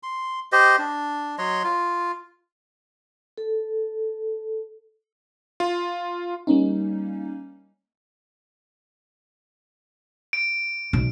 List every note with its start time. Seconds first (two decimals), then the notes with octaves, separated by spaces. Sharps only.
0.03 C6
0.52 G4 C5 D#5
0.78 D4
1.38 F#3 C#5 D#5 C6
1.64 F4
3.38 A4
5.60 F4
6.47 G3 A#3 C#4 D#4
10.33 D7
10.93 B1